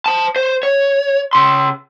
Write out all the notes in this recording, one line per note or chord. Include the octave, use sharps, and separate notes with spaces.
C5 A5
C5
C#5
C#3 C6